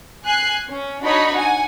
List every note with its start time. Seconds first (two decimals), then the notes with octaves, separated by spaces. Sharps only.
0.25 G#5 F#6 C7
0.68 C#4
1.02 D4 D#4 F#4 C#5 D#5 B5
1.35 F#5 G#5